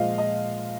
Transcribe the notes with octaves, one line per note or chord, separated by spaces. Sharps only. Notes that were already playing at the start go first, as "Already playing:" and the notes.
Already playing: A#2 F3 G#3 D#5 F5
D#5